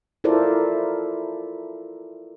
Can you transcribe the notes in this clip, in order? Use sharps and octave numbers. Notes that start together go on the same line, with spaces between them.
E4 F4 A4 A#4 C5 D5